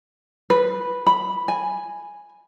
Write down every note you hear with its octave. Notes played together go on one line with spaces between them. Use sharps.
B4
B5
G#5